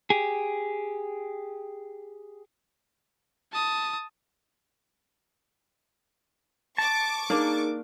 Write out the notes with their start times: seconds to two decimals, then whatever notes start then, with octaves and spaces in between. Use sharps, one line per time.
0.10 G4 G#4
3.52 A5 D#6
6.78 A5 C#6 D6
7.30 A#3 D4 D#4 G#4 A#4